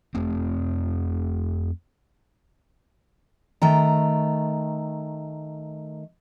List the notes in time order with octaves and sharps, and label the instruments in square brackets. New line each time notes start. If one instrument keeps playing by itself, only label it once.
[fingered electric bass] F2 A3 C4
[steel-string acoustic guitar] D#3 A3 G5 A#5